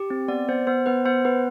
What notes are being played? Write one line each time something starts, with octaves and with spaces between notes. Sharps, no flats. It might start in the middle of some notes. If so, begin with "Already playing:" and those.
Already playing: G4
C4
B3 D5
B3 C5
B3 C5
B3 B4
B3 C5
B3 B4